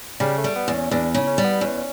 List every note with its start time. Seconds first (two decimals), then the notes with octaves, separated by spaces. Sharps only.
0.20 C#3 G3
0.38 A3
0.44 G3
0.56 B3
0.68 E2
0.74 C#4
0.91 E2 D4
1.15 C#3
1.27 C#4
1.38 G3
1.44 B3
1.61 E2 C#4